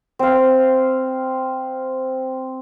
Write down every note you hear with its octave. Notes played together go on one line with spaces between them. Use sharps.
C4 F5